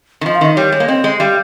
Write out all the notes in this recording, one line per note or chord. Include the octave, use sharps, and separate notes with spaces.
D#3
F3 D#5
F5
D#3 D#5
G3 C#5
G#3
A#3
C4 D#5
G#3
G3 F5